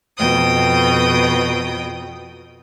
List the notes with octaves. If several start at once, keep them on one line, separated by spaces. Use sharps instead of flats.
F2 B2 G5 D#6